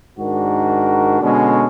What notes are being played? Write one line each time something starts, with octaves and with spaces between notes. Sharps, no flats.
G#2 D#3 D4 F#4 A#4
B2 D3 G#3 C#4 D4